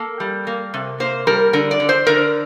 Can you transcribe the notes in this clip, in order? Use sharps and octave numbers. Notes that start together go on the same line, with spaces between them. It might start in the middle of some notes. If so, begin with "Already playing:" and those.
Already playing: A#3 A4
G3
A#3
C3
A#3 C5
G3 A#4
D3 A#4
D5
D3
C5
D3 A#4